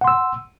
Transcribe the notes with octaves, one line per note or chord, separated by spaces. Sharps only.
F#5 C6 E6